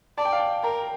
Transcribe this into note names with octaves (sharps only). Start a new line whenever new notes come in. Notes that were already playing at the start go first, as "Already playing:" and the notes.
D5 A5
G5
F5
G5
A#4 A#5